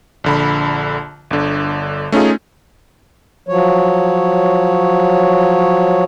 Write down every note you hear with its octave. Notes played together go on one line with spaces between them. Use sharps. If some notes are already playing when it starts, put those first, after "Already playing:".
A#1 D3 B5
G1 D3
A3 C#4 D#4 F4 G#4
F3 F#3 C#5